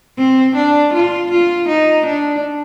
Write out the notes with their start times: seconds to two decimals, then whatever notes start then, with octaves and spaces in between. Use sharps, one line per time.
0.18 C4
0.55 D4
0.93 F4
1.31 F4
1.68 D#4
2.06 D4